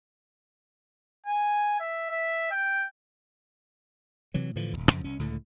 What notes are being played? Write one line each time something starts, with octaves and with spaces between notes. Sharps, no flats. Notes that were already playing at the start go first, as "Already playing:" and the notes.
G#5
E5
E5
G5
C3 E3 F#3
A2 D3 E3 F3
D#1 D#2
F2 C#3 F3
C2 C#4
C#2 A2 D3